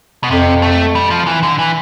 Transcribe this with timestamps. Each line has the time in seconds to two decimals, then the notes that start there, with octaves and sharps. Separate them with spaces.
0.24 B2
0.31 F2 C3
0.62 A3
0.95 G3
1.11 F3
1.27 E3
1.43 D3
1.59 E3